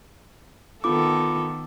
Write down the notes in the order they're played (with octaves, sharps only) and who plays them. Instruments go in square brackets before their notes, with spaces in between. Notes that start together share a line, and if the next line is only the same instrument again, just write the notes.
[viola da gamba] D#3 B3 A4 [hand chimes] F4 D6